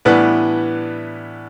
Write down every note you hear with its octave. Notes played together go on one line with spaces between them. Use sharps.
A2 E3 G3 B3 D4